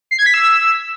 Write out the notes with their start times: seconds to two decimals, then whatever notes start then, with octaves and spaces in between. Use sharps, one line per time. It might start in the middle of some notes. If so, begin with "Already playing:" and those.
0.11 C7
0.19 G#6
0.26 B6
0.34 E6